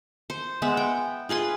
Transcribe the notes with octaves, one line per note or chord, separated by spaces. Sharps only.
C5
G#3 B3 E5
G5
F4 G#4 B4 C6